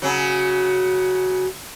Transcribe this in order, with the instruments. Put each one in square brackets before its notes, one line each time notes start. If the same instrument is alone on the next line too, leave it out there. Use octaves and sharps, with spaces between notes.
[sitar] C#3 F#3